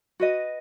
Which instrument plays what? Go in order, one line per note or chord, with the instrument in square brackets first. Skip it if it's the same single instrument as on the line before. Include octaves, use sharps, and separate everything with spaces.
[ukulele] F#4 B4 D#5